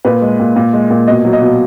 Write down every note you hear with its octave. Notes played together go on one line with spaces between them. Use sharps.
A#2 B4
G#3
A#2
A#2
G#3
A#2
B2 D#5
F#3
D#5
B2